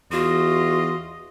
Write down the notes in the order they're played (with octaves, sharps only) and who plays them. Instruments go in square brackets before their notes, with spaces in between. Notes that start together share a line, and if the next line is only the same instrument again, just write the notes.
[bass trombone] E2 [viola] F4 [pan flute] F#4 [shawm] D#5